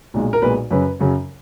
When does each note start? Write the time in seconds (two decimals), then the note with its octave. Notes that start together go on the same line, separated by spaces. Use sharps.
0.14 B1 A#2 G#3
0.33 A#4
0.42 B1 A#2 G#3 B4
0.71 F#2 C#3 F#3 C#4 B4
1.00 F#2 C#3 F#3 C#4